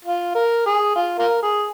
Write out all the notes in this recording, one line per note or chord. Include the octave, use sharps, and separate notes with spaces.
F4
A#4
G#4
F4
F4 A#4
G#4